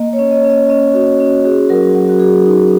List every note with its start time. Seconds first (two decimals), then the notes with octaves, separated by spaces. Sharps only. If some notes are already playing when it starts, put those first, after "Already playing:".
Already playing: A#3 D#5
0.13 C#5
0.19 C#4
0.31 D#5
0.45 C#4
0.50 D#5
0.69 C#4 D#5
0.94 F#4
1.20 C#4
1.44 F#4 G#4
1.69 F#3 A#4
1.95 F#3 F#4
2.09 F#4
2.20 F#4 G#4
2.46 D#4